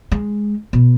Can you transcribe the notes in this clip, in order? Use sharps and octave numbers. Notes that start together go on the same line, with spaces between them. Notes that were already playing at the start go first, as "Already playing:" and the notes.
G#3
B2